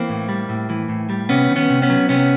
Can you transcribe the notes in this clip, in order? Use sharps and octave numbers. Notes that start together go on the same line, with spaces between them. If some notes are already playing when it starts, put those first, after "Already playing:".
Already playing: E3 A#3 C4
A2
G3
A2
E3
A2
G3
C3 B3 C#4
D#3
B3 C#4
C3
B3 C#4
F#3
C3 B3 C#4